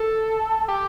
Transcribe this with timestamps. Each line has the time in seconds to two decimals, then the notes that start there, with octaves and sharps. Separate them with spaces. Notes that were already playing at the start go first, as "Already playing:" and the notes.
Already playing: A4
0.68 G4